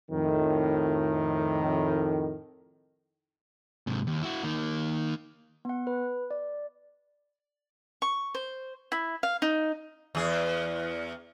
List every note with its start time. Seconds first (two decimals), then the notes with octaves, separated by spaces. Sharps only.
0.11 F2 A2 D#3
3.87 G#2 C3
4.07 D#2
4.23 E4 F#4
4.43 D#3 A#3
5.65 B3 F#5
5.87 B4
6.31 D5
8.02 C#6
8.35 C5
8.92 E4
9.23 F5
9.42 D#4
10.15 E2 G#4